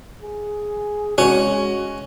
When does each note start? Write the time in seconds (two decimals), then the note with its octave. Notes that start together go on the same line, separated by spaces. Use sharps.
0.22 G#4
1.18 G#3 C#4 F#4